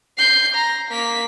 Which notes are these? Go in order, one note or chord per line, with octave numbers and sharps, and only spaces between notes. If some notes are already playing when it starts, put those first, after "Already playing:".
G6 C7
A#5
A#3 B6